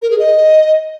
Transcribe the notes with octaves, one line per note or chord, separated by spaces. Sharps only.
A#4
G#4
D#5